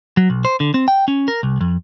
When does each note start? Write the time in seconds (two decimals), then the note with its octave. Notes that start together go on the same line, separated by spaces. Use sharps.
0.17 F#3
0.30 B1
0.45 C5
0.60 D3
0.74 C4
0.88 G5
1.08 C#4
1.28 A#4
1.43 C2
1.61 F2